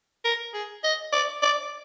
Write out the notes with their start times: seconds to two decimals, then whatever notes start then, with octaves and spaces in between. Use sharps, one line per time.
0.25 A#4
0.54 G#4
0.84 D#5
1.13 D5
1.42 D5